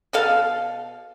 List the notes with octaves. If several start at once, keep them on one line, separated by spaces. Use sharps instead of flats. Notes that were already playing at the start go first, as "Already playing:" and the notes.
B2 A4 F5